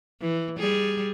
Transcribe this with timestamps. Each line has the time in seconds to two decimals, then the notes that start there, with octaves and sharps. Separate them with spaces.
0.21 E3
0.58 G3 G#4